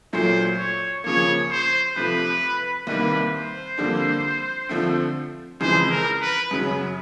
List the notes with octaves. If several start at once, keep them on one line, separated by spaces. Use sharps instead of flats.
A#2 F#3 A3 C5
C#5
C#3 F3 A#3 C#5
C5
C3 F3 A3 B4
C2 C3 D#3 G3 A#3 B4
C5
F2 D3 G3 A#3 D4
D3 F3 A3 C4
F2 C#3 E3 G#3 C5
A#4
B4
F#2 C#3 F#3